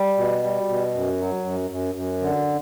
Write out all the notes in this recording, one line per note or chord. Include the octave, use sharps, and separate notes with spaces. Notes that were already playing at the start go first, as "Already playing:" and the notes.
Already playing: G3
B2
G3
B2
F#2
F#3
F#2
F#2
F#2
D3